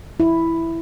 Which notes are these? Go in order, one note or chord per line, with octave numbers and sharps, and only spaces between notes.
E4